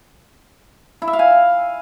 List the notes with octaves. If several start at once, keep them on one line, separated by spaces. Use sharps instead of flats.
E4
E5
F5
G#5